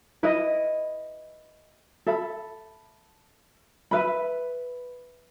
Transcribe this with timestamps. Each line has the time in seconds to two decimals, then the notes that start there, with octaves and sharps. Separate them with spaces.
0.23 E4 B4 D#5
2.06 A4 E5 B5
3.91 B4 E5 B5